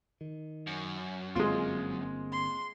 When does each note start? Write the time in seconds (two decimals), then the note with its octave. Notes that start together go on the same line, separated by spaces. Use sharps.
0.21 D#3
0.67 F#2
1.35 G1 G#3 A#3 C4 F4
2.32 C6